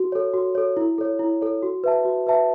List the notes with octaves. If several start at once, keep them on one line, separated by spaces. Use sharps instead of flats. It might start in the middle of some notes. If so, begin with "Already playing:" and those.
Already playing: F#4
A4 C#5
F#4
A4 C#5
E4
A4 C#5
E4
A4 C#5
F#4
B4 E5 A5
F#4
B4 E5 A5